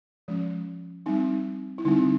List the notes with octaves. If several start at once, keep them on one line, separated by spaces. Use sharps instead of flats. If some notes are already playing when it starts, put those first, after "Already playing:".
F3 G#3 C#4
G3 C4 D#4
E4
D3 G3 C4 D#4